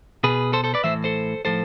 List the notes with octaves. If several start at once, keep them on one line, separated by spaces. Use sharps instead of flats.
B2 G#4 B4
A4 C5
A4 C5
B4 D5
A2 E3 C5 E5
A4 C5
A2 F3 A4 C5